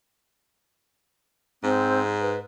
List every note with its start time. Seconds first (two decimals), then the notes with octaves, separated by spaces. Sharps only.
1.63 G#2 C4
2.21 B4